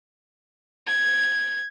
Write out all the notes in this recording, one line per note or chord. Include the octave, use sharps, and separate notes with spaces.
G#6